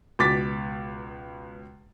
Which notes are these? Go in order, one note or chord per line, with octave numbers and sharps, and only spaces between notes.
C#2 B2 D6 A6 B6